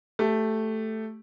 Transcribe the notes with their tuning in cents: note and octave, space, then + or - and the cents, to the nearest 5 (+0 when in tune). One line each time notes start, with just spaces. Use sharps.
A3 +0 G4 +0